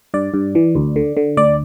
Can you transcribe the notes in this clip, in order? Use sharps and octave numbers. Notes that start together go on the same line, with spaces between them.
G2 D5
G2
E3
D2
D3
D3
D2 D5